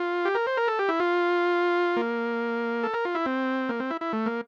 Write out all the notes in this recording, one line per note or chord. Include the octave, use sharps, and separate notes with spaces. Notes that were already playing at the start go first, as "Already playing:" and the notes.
Already playing: F4
G4
A#4
C5
A#4
A4
G4
E4
F4
A#3
A4
A#4
F4
E4
C4
A#3
C4
E4
E4
A3
A#3